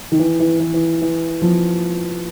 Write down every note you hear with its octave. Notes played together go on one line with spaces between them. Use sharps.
D#3
E3
E3
E3
E3
E3
F3